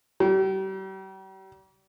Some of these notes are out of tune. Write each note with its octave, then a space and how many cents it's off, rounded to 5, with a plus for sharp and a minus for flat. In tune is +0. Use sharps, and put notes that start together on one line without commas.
G3 -40